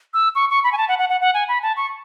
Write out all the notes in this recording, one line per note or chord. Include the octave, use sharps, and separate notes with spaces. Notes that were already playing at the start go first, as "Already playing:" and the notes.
E6
C#6
C#6
B5
G#5
A5
F#5
F#5
F#5
F#5
G#5
B5
A5
C#6